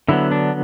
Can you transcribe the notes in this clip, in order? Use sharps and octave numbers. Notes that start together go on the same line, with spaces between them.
D3 F#3 B3 E4
D4